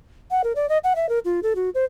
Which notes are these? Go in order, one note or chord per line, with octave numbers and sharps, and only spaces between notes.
F#5
A#4
D5
D#5
F#5
E5
A#4
F4
A4
F#4
C5